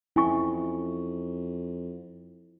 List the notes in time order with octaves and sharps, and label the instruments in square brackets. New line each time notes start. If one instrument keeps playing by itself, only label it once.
[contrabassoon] F2 [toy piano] C#4 G#5 C#6 [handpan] E4